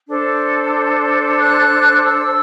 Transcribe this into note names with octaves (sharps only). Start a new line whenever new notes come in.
D4 A4 C5
F#6
E6